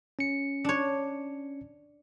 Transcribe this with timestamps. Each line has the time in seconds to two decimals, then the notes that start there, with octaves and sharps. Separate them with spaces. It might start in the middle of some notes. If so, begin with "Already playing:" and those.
0.19 C#4 C#7
0.64 D4 C#5